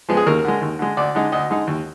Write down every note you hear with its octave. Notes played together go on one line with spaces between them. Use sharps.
F3 G#3 B3
G#4
D#2 A#4
D3 G#3
D#2
D3 G#3
D2 D5
D3 G#3 D#4
D2 D#5
D3 G#3 D#4
D#2